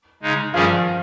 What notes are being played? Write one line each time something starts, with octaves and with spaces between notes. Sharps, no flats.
C#3 G#3 D#4
G2 D#3 F3 G3 C#4 F4 G#4